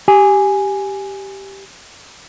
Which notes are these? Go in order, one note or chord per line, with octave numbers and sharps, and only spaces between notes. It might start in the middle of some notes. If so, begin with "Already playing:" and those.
G4 G#5